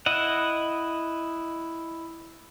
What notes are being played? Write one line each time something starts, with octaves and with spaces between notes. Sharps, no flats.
E4 D#5 F#5